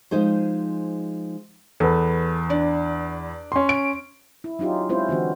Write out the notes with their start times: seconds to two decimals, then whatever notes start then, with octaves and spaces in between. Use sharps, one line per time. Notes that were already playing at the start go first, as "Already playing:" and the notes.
0.11 F3 G#3 D#4 G#4 C5
1.80 E2 A4 B4
2.49 D4 D5
3.52 C#4 C6
3.69 D7
4.44 E4
4.59 F#3 C#4 D#4 F4 G4
4.89 G#3 C4 C#4 E4 F4 C5
5.09 D3 E3 C4 F#4